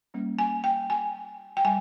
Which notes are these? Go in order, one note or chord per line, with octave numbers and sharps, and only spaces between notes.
G3 A#3 C#4
G#5
G5
G#5
G5
G3 G#5